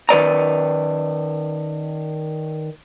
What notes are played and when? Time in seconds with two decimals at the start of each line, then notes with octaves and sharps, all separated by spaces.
0.09 D#3 B4 D5 A#5